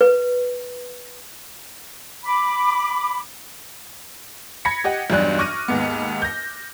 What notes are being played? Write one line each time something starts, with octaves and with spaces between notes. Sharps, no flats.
B4
B5 D6
B5 G#6 A#6 B6 C#7
G4 D#5 F#5
B1 E2 G2 D4 F#6
C#6 D6 F6 F#6 A#6 D#7
D#2 G#2 B3
G6 A#6